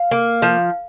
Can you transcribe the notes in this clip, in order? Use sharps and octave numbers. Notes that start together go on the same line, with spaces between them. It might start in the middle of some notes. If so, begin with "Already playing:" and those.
Already playing: F5
A#3
F3